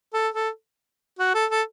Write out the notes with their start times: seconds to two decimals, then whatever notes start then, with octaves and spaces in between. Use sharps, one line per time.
0.14 A4
0.34 A4
1.19 F#4
1.35 A4
1.51 A4